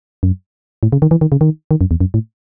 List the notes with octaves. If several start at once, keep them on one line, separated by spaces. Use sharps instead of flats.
F#2
A2
C#3
D#3
E3
D#3
C#3
D#3
D#3
F#2
E2
F#2
A2